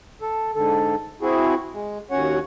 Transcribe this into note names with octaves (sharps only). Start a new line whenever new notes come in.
A4
G#2 D3 A4
C4 E4 F#4 G#4
G#3
D#2 C#4 F#4 C#5 F#5